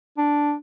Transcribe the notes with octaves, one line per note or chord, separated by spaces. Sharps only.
D4